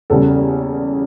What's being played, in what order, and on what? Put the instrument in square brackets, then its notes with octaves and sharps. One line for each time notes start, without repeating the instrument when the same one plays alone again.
[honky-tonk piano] E2 C#3 G3 A4